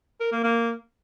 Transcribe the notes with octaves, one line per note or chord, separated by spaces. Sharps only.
A#4
A#3
A#3